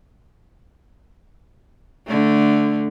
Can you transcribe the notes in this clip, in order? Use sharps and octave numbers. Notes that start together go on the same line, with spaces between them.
D3 A3